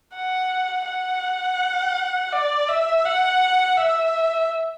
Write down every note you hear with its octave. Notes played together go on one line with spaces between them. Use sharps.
F#5
F#5
D5
E5
F#5
E5